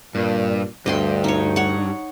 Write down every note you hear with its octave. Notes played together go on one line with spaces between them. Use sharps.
G2 A#2
D2 G2 D#5 G5 C6
D#4 C#5
C#5 F#5